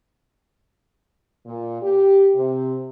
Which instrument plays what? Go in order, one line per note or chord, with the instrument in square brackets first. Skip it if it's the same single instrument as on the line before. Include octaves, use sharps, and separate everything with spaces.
[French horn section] A#2
G4
C3